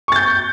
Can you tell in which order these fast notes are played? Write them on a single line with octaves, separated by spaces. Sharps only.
C#6 A6 G6